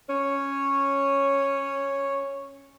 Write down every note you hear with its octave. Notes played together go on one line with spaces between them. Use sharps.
C#4 C#5